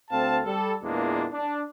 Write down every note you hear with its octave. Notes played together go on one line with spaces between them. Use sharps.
D2 C4 A4 F5 A5
G3 A4
E2 A#2 E3 G#3 A#3 D4
D4